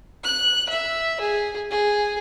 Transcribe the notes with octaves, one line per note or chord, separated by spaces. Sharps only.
F#6
E5
G#4
G#4